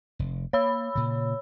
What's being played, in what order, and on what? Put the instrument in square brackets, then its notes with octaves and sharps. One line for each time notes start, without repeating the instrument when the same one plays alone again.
[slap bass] F1
[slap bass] A#3 [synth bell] C#5 B5 E6
[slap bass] A#2 C#3